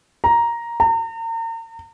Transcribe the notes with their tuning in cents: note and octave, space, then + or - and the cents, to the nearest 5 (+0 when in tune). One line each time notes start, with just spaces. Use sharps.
A#5 +5
A#5 -40